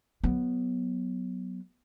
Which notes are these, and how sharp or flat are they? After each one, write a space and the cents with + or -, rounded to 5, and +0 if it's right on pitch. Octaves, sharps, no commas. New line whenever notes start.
F#3 +0 B3 +0